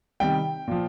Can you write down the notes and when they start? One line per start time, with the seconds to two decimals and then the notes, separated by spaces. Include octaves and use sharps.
0.20 C3 D#3 G3 G5
0.68 A#2 F3